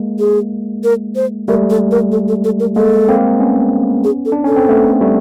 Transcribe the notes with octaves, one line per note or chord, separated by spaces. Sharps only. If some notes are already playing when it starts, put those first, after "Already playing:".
Already playing: G#3 A#3
G#4
A#4
C5
G3 A3 A#4
A4
A#4
A4
A4
A4
A#4
G#3 A#3 A4
A#3 C4
B3 C#4
G#4
A4
D4
C#4 A4
C4
A3 B3
G3 A3